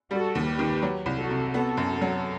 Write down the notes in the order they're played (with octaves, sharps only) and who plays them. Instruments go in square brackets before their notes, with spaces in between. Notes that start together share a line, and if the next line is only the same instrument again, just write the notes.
[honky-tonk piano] G3 [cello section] F#4 A4
[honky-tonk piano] D#2
[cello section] G4 B4
[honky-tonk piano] D#3
F#3
C2
[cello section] F#4 A4
[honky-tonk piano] C3
[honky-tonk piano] B3 [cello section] F#4 A4
[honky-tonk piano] F#2
F#3